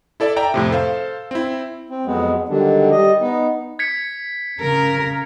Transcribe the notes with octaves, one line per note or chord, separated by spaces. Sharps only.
E4 A4 D5 E5
D5 E5 G5 A#5
F2 A2 C3
A4 C5 F5
C4 E4
C4
F2 F#3 G#3 B3
D3 D#3 F#3 G3 D4
G3 D#5
B3 D#4
G#6 B6 C#7
C#3 A#4